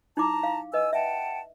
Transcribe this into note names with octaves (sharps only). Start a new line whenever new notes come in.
D#4 E4 A5 A#5 D6
F5
B4 D#5 G#5 E6
E5 F#5 G5 A5